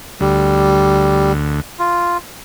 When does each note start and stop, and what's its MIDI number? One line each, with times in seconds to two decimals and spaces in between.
0.20 1.61 38
0.20 1.32 55
1.79 2.17 65